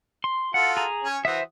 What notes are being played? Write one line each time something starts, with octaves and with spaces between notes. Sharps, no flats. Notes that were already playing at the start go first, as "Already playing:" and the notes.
C6
F4 F#4 A4 F#5
G#4 A#5
C#4 C#5 G#5
E3 F#4 C5 E5 D#6